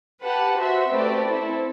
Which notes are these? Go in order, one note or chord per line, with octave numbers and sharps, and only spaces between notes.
G4 B4 F#5 A5
F#4 C5 E5
A3 C4 G4 B4 D5
C4 E4 A4